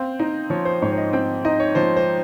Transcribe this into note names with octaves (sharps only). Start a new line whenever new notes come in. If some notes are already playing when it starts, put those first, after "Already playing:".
Already playing: C4 F5
D#4
F3 C#5
C5
G#2 C#5
C#5
D#5
C4 G5
D#4 D#5
C#5
F3 C5
C5